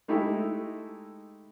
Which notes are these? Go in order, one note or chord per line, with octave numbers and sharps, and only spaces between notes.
G#3 A3 D#4 E4 G4